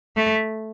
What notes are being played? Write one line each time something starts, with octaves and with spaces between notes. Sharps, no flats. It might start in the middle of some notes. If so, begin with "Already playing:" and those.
A3